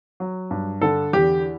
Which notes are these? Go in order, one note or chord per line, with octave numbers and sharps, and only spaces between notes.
F#3
G2
D3 A4
E2 G4